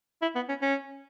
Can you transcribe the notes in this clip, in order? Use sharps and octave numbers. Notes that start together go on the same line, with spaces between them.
E4
B3
C#4
C#4